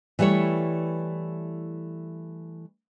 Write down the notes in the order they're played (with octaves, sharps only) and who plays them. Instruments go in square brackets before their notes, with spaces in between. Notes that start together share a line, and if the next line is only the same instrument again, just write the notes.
[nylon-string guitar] E3 G3 A3 E4 C#5